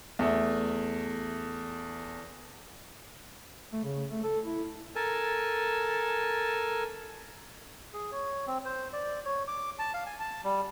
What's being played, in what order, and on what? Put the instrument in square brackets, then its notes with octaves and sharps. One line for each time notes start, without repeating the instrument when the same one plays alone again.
[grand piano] E2 A3
[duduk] A3
C#3
A3
A4
E4
[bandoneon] A4 A#4 G#5 A5
[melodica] G#4
C#5
C4
C5
D5
C#5
D6
A5
F5
G#5
A5
G3